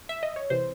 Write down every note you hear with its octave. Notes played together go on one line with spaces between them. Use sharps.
E5
D#5
C#5
C3 E3 C5